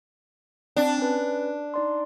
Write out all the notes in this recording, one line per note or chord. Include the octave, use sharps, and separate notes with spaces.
C4 D4 A5
C#4 B4
D#4 D5 C6